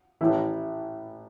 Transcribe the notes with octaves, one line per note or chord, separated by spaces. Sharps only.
A1 A2 E3 E4